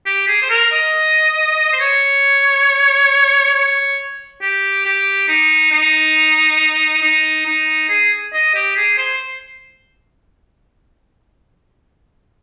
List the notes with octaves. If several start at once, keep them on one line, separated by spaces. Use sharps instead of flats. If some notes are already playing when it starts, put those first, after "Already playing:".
G4
G#4
C5
A#4
D#5
C5
C#5
C#5
G4
G4
D#4
D#4
D#4
D#4
G#4
D#5
G4
G#4
C5